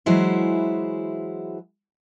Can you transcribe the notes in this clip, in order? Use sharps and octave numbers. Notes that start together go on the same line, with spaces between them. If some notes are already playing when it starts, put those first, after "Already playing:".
E3 F#3 G#3 E4 F#4 C5